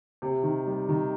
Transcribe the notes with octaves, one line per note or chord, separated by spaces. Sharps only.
C3
D#3
G3
D#3